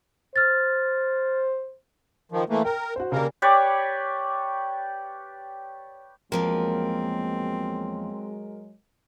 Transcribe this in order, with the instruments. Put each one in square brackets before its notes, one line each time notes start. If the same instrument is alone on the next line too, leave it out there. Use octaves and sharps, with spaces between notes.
[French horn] C5 [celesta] F6 A6
[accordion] D#3 F3
E3 A3 A#3
[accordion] A#4 [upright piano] G5
[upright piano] F#4 C5
[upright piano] C#3 G4 D5 [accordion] A#3 A#4
[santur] G4 B4 C#5 D5
[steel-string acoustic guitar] E2 F3 A#3 [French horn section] F#3 G#3 [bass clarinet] C4 [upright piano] A#4